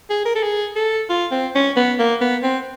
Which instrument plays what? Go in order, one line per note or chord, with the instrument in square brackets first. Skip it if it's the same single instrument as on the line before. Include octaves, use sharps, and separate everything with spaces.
[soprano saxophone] G#4
A#4
A4
G#4
A4
F4
C4
C#4
B3
A#3
B3
C4